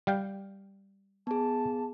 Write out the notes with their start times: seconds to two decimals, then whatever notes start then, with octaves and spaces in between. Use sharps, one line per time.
0.07 G3 F5 G5
1.27 B3 G#4 A5